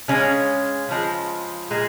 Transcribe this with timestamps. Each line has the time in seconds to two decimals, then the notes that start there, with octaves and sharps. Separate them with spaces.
0.08 C#3 G#3 C#4
0.89 C#3 F3 G#3
1.70 A#2 G#3